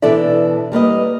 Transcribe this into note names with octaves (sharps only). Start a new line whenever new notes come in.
B2 E3 D4 A4 D5 E5
G3 A#3 B4 D#5